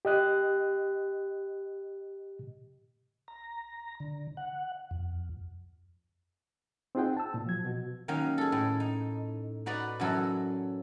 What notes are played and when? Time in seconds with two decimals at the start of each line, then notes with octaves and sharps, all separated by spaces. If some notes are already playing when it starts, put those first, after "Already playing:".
0.05 G4 D#5 F#6
3.28 A#5
4.00 D3
4.37 F#5
4.91 F2
6.95 C4 D#4 F4 G#4 F#5 G5
7.17 A5 E6
7.34 A#2
7.46 F3 F#3 G#6
7.64 B2 F#4
8.08 D#3 F#3 A#3 C#4 D#4
8.38 G#4 A4
8.52 A2
8.80 D#4
9.66 D#4 F#4 B4 D5
10.00 F#2 E3 F#3 A4